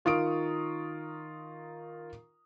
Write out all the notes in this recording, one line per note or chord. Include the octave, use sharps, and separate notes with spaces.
D#3 F4 A#4 C#6 D#6 D7